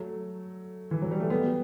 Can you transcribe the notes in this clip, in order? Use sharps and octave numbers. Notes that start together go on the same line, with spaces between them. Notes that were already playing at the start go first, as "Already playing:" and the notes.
Already playing: F#3 A3
E3
F#3
G3
A3
G3 B3